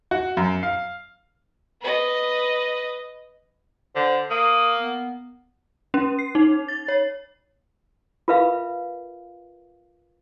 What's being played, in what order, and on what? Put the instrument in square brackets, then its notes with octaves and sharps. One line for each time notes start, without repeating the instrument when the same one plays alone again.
[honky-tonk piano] F#4
F#2
F5
[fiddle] B4 D#5
[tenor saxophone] D3 [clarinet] C5
[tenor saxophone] A#3 [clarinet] D#6
[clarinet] B3
[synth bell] C#4
C7
D#4
A6
C#5
[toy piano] F4 A#4 B4 E5 F5